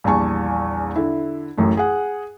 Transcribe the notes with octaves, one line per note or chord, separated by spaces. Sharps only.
A#1 E2 G3 G#5 A5 C#6
D3 E4
A1 F#2 A2
G#4 F#5